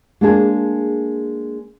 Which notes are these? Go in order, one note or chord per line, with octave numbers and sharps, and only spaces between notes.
G#3 A#3 D4 G#4